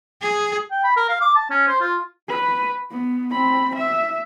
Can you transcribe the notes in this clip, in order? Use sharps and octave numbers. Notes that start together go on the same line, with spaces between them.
G#4
G5
B5
A#4
F5
D6
A5
C#4
C5
F4
B4
B3
C4 B5
E5